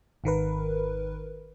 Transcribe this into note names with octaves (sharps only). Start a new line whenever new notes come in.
G#1 D#3 A#4 B4